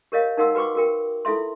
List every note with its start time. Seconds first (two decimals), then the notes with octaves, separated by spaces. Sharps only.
0.12 G4 A#4 C#5 D#5 F5
0.37 D#4 A#4 F5 F#5 C6 E6
0.55 F#4 B4 G5 C#6 D6
0.75 F#4 A#4 G5
1.25 E4 F4 A4 E5 C6